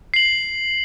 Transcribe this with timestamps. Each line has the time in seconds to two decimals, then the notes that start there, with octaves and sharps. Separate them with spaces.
0.14 C7 F#7